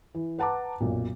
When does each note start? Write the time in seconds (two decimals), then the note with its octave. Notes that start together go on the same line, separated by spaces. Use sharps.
0.15 E3
0.39 B4 F#5 A5 A#5 D6
0.80 B1 F#2 A#2